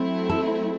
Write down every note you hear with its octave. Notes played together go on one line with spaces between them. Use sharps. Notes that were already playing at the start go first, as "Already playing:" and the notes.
Already playing: F#3 A3 C4 E4
A4